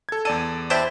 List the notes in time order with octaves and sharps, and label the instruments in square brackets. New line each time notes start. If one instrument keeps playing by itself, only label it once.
[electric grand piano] A4 G#6
[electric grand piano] E2 D5 D#7 [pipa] A4
[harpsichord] D4 E4 G4 [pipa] C5